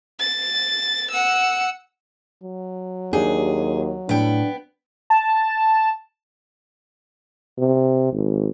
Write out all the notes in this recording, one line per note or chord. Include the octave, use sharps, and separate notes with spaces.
A6
F#5 E6
F#3
D#2 D4 G4 G#4
A2 B3 D4 G5
A5
C3
G#1